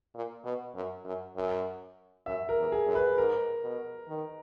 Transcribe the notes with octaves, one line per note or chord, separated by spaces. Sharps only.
A#2
B2
F#2
F#2
F#2
F#2 E5
A#4
E2
G#4
F#2
B4
G#2 A#4
B2
D#3